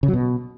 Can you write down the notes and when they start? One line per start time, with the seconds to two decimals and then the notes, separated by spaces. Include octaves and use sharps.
0.03 C#3
0.08 F#3
0.13 B2